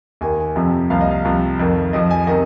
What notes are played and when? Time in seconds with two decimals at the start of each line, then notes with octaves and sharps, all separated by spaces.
0.21 D#2 D#3 G#5
0.40 G#5
0.56 F2 C3 F3
0.90 C2 A#2 F3 F5
1.01 D#5
1.10 F5
1.25 C2 C3 F3
1.59 F2 D#3
1.93 F2 F3 D#5
2.11 G#5
2.27 C3 D#3 D#5